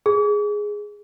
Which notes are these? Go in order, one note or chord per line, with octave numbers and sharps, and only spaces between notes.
G#4